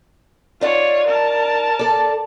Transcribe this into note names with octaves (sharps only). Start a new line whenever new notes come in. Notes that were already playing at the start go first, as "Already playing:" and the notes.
D#4 F4 C#5 D5 F#5
A#4 A5
A4 D5